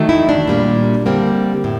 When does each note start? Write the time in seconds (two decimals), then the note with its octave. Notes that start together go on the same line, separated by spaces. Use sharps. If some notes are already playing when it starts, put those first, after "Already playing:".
Already playing: D#3 F#3 A3
0.09 E4
0.29 D4
0.48 A#2 G3 A#3
1.06 D3 G3 A#3 C4
1.64 A2